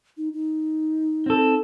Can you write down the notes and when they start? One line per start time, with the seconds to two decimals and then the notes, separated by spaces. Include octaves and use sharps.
0.17 D#4
0.33 D#4
1.26 C4 A4